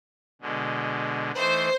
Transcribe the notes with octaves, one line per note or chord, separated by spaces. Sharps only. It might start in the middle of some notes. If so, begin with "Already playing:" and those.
B2 D3 G#3
E3 A3 D#4 C5